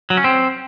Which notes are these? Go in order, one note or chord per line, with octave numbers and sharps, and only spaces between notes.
F#3
C#4
C4